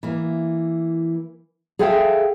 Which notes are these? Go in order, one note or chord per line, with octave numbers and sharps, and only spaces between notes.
E3 A#3
G#4 A4 E5 F5 G5